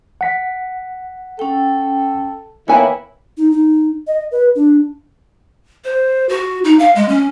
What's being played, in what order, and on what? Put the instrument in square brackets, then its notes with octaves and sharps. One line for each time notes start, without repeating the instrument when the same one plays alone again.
[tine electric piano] F#5 B6
[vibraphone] C#4 G5 [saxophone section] A4
[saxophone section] D#3 A#3 E4 [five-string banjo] B3 G#5 [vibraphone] B4 C#5 G5
[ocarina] D#4
D#4
D#5
B4
D4
[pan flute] C5
F#4
D#4
F5
G#3
C#4